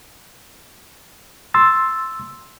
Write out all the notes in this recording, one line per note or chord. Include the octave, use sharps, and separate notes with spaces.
C6 E6 A6